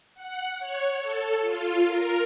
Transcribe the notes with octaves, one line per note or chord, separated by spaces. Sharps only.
F#5
C#5
A4
F4
A#4